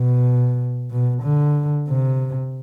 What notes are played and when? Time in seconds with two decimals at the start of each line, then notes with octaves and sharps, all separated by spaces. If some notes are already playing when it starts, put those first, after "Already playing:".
Already playing: B2
0.91 B2
1.23 D3
1.88 C3